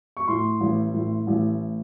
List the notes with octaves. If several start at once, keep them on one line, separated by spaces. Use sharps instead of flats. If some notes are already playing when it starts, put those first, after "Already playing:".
C#6
A2 C6
A1
A2
A1